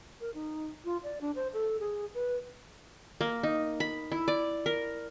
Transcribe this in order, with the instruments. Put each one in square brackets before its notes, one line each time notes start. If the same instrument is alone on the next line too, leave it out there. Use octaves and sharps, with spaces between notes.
[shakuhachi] A#4
D#4
F4
D5
D4
C5
A4
G#4
B4
[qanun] A#3
D#4
B5
E4
D5
A#4